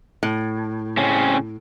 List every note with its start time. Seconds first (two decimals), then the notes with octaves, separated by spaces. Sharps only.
0.23 A2
0.97 C#3 C4 C#4